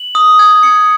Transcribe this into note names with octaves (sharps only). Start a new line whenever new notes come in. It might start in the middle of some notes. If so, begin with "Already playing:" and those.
Already playing: F#7
D#6
G#6
C#7